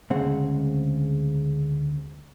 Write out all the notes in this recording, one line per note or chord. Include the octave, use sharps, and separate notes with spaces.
D2 C#3 G#3 C4 F#5